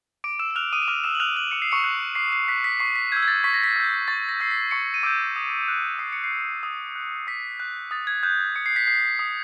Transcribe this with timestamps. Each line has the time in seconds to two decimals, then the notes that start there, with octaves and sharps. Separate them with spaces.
0.24 D6 D7
0.39 E6 E7
0.51 E7
0.55 F6 F#6 F7
0.73 D#6 D#7
0.82 E7
0.88 D6 F6 F7
1.04 E6 E7
1.15 F#7
1.20 F6 F#6 F7
1.36 F#6 F#7
1.51 D6 C#7
1.62 C7
1.72 C#6 C#7
1.84 F#6
2.15 D6 C7
2.32 C7
2.48 F#6 B6
2.64 B6
2.80 C#6 C7
2.95 B6
3.12 E6 G6 G#6
3.23 G#6
3.28 A6
3.44 C#6 B6
3.54 A#6
3.64 B6
3.76 E6 G6
4.08 C#6 A6
4.29 A#6
4.40 E6 G6 C7
4.51 B6
4.71 C#6 C#7
4.94 D#7
5.03 D6 E6 G6 D7
5.36 D#6
5.68 F#6
5.99 D#6 C7
6.13 C#7
6.24 C7
6.31 F#6
6.63 D#6
6.96 F#6
7.27 D#6 B6
7.60 F#6
7.91 D#6 A6
8.07 G#6
8.23 F#6 G6
8.56 D#6 C#7
8.66 C7
8.76 B6
8.87 F#6 C7
9.19 D#6